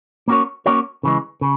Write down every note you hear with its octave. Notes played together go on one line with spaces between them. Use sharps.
A#3 C#4 F#4 A#4 C#5
A#3 C#4 F#4 A#4 C#5
C#3 E3 G#3
C#3